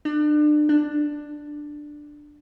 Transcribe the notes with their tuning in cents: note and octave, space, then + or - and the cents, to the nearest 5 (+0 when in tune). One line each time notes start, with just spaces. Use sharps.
D4 +35
D4 +10